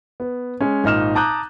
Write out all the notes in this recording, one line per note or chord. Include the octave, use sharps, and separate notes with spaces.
B3
G#3 C#4
G#1 A#2 D#4 F6 E7
A5 A#5 D6 D#6 F#6 G6